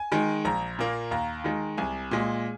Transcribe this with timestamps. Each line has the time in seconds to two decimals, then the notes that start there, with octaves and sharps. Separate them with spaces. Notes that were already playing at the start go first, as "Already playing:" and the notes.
Already playing: G#5
0.12 D#3 G#3
0.45 A#1 A#5
0.79 A#2 A#3
1.11 D#2 A#5
1.44 D#3 G#3
1.78 C2 G#5
2.11 A#2 G#3